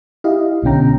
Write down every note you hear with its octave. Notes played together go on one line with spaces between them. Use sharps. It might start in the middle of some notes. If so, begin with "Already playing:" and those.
E4 G4 D#5 F5
B1 B2 D3 C#4 G5 A#5